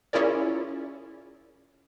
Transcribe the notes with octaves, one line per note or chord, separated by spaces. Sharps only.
C#4 E4 F4 G#4 A#4 D5